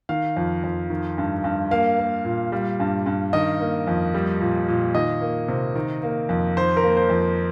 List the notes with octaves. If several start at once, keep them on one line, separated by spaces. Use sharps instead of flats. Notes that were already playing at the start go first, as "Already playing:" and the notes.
D#3 F5
F2
F2
D#3
G2
G2
A#3 F5
A#3
A#2
G3
G2
G2
D#3 D#5
A#3
F2
G3
A#2
A#2
D#3 D#5
A#3
C3
D#3
A#3
F2
D#3 C5
A#4
A#3
C5
F2